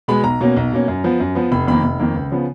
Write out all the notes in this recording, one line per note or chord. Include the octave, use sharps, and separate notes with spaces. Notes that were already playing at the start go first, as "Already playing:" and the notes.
B2 G#3 B3 B5
B1 A#5
B2 A#3 C#4
B1
B2 A#3 C#4
F#2
F3 B3
F#2
F3 B3
F1 B5
F2 D#3 A#3 B5
F1
F2 D#3 A#3
C#2
C#3 F3 B3